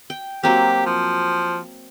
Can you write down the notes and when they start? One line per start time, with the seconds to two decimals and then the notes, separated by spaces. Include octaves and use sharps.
0.10 G5
0.43 F#3 A#3 C4 G4
0.86 F3